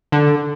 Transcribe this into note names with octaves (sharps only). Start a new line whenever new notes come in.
D3